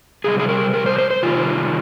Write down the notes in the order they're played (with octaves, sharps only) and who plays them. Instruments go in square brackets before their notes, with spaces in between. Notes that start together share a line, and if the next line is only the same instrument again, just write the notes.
[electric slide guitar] C3 G3 G#4
G#4
A#4
A#4
C5
C5
C5
C3 D#3 G3 F4